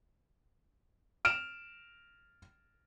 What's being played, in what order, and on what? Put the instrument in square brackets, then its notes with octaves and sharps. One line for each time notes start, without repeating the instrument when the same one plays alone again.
[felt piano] F6 D7 E7